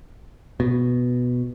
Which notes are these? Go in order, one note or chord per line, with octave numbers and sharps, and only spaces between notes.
B2